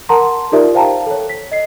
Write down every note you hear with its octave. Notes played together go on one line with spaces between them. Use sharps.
A#4 F#5 A5 A#5 C6
D#4 F4 G4 A#4 D5 E5
C5 F5 G5 A5 A#5
A4 C#5
B6
D#5 C7